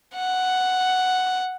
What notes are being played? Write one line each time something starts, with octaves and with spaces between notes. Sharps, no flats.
F#5